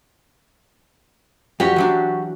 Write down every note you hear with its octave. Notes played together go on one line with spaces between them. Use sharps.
F2 C#4 F#4 G4
E3 F#3 D4